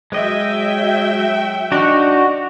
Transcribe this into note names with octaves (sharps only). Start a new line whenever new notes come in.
F#3 G#3 D#5 E5 G5
D4 D#4 F#4